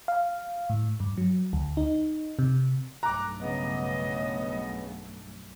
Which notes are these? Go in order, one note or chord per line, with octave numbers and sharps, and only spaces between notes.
F5
A2
G2
F#3
D2
D#4
C3
B1 G2 A3 A#5 D6 F#6
C#3 B3 D#5